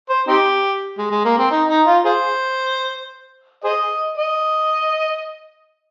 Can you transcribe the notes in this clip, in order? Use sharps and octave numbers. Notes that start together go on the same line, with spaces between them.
C5
C4 D#4 G4
G#3
G#3
A#3
C4
D#4
D#4
F4
F4 G#4 C5
G#4 C5 D#5
D#5